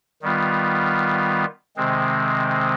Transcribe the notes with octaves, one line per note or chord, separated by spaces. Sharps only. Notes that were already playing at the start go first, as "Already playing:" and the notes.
D#3 G3 B3 F4
C3 D#3 G#3 C4